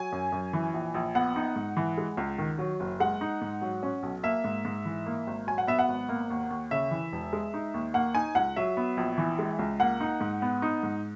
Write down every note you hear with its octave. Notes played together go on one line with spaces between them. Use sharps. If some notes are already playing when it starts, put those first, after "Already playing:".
Already playing: F#3 G#5
F#2
F#2
E3
A#1
A#1
B3 F#5
D#4
G#2
E3
G#3
C#2
D#3
F#3
F#1
G#3 F#5
D#4
G#2
F#3
C#4
B1
A#3 E5
G#2
G#2
E3
A#3
G#1
F#3 G#5
F#5
B3 E5
F#5
G#1
A#3
D#2
D#2
C#3 E5
E3
E1
G#3
D#4
D#2
A#3 F#5
D#4 G#5
C#2 F#5
F#3 E5
B3
A#1
E3
G#3
C#2
A#3 F#5
D#4
G#2
B3
D#4
G#2